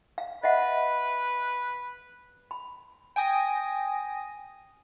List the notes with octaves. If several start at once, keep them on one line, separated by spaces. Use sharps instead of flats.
F5
B4 D#5 E5 F#5
B5
G5 G#5 D#6 A#6